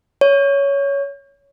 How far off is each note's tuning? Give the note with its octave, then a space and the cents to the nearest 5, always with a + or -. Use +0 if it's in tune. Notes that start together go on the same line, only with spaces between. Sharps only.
C#5 +15